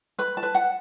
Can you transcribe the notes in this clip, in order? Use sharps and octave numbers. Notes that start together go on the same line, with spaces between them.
B4 B5
A5
B4
F#5